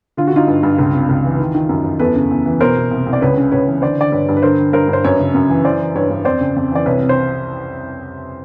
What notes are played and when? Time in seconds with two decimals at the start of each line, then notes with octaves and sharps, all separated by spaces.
0.17 D3 F4
0.27 F#4
0.32 D3 D#4 F4
0.47 G2
0.63 G2
0.79 C#2
0.94 C3
1.09 C#2
1.25 E3
1.39 D#3
1.55 D#3
1.69 F#2
1.84 F#2
1.99 E2 A4 B4
2.15 C#3
2.31 E2
2.46 E3
2.61 B2 A#4 C5
2.76 B2
2.91 C2
3.06 C2
3.13 D5
3.21 C#2 B4 C#5
3.37 C#3
3.52 C#2 B4 C#5
3.67 E3
3.82 D3 C5 D5
3.98 D3 D5
4.12 G2 B4 C#5
4.29 G2
4.37 B4
4.43 D3 A#4 C5
4.58 D3
4.73 G2 A#4 C5
4.88 G2
4.93 C5
5.04 F#2 B4 C#5
5.20 C#3
5.34 F#2
5.49 E3
5.65 E3 C5 D5
5.80 E3
5.95 G2 B4 C#5
6.10 G2
6.25 F2 C5 D5
6.40 C#3
6.56 F2
6.72 E3 D5
6.86 C2 B4 C#5
7.02 C3
7.09 C5